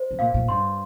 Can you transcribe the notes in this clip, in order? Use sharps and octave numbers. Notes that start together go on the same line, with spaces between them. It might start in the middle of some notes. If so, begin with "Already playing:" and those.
Already playing: C5
C3
A#2 F5
A#2
G2 C6